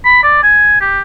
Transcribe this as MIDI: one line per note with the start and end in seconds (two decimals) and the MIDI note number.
0.05 0.21 83
0.23 0.40 74
0.43 0.78 80
0.81 1.02 67